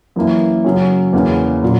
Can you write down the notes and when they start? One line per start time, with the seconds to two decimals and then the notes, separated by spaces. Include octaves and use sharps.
0.16 F#2 E3 A#3 E4
0.65 F#2 C#3 F#3 C#4
1.13 E2 C#3 E3 A#3 C#4
1.63 A#2 F#3